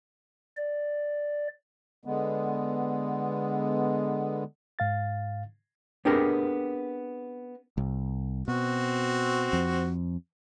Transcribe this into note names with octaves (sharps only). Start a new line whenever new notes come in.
D5
D3 G#3 B3
G#2 F5 A6
B3 C4 D4 G4 G#4 A#4
C2
B2 C4 F#4
F2